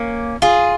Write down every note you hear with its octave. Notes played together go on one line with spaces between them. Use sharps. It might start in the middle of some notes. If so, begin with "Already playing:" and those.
Already playing: A#3 C#4
F4 G#4